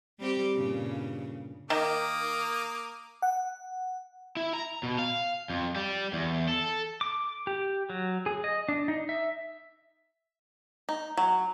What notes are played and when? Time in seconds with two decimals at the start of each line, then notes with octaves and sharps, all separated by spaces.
0.19 G3 C4 G4
0.56 G2 A#2 C#3
1.70 D#3 A#3 D6 D#6
3.22 F#5
4.37 E4
4.53 A#5
4.83 B2
4.98 F5
5.50 F2
5.76 G3
6.13 E2
6.48 A4
7.01 D6
7.47 G4
7.90 F#3
8.26 G#4
8.44 D#5
8.69 D4
8.88 D#4
9.09 E5
10.89 D#4
11.17 F#3